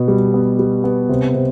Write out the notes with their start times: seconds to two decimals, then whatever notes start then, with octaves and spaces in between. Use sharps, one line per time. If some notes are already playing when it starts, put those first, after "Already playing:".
Already playing: B2 B3
0.08 G3
0.34 B3
0.59 G3
0.84 B3
1.09 C3
1.34 C3